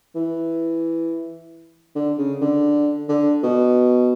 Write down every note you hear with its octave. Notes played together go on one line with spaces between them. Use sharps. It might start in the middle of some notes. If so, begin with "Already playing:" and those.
E3
D3
C#3
D3
D3
B2